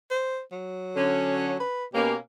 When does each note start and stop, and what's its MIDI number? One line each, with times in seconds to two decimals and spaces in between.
0.11 0.41 72
0.52 1.58 54
0.96 1.60 50
0.96 1.60 61
1.60 1.85 71
1.94 2.15 47
1.94 2.15 58
1.94 2.15 61
1.94 2.15 67